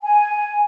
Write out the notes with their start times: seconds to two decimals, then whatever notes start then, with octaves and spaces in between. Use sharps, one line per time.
0.03 G#5